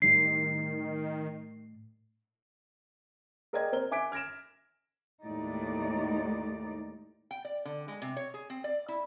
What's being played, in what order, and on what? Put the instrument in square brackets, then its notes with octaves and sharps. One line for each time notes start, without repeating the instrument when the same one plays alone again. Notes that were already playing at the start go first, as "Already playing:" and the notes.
[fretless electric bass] A2 G3 D4 [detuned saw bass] D#3 [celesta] C7
[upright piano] G#4 A#4 D5 D#5 G5 G#6
C4 A#4 G7
E5 G#5 D6 G#6 B6 D7
F6 G#6 A#6 D7 E7
[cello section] D#2 A2 G#3 D#4 D5
[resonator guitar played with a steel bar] G5
D5
D3
G#3
C3
C#5
G#4
C4
D5
E4